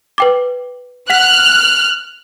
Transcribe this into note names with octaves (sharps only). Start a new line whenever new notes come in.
B4 G5 D6
F#5 F6 F#6 B6 F7